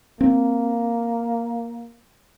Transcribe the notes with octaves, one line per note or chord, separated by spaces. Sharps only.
A#3 C4